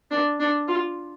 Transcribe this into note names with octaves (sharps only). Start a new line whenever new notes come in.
D4
D4
F4